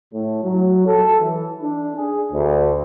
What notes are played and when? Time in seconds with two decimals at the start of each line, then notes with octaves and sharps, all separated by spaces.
0.13 A2
0.43 F#3
0.86 A4
1.19 E3
1.61 D4
1.95 G#4
2.32 D2